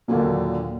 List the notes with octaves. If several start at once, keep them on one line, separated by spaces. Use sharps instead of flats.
D#2 A#2 D3 F#3 A#3